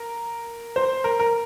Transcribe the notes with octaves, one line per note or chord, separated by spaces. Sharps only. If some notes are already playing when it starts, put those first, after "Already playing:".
Already playing: A#4
C5
A#4
A#4